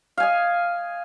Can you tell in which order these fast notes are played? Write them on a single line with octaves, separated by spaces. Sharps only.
F5 G#5 D#5